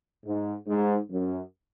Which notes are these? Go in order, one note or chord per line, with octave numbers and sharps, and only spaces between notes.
G#2
G#2
F#2